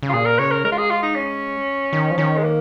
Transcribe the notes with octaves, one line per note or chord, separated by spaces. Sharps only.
C#3
F4
A#2 G#4
A#4
C#3 C#5
A#4
G#3 A#4
F4
G#4
F4
D#4
C#4
D#3
F3
D#3 C#4
G#3
A#3